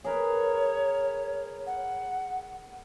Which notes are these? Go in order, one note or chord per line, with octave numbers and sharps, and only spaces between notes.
G#4 A#4 B4 C#5
F#5